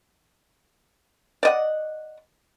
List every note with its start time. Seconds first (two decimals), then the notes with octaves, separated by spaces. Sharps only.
1.43 D5 D#5 F#5